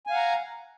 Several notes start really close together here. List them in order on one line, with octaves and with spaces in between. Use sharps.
G#5 F5 F#5 A#5